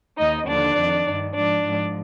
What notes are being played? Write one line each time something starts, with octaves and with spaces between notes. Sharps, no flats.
D#2 D#3 D#4 D#5
D#2 D3 F3 D4 D5
F2 D#3
G2 D#3
G#2 F3 D4 D5
G#2 F3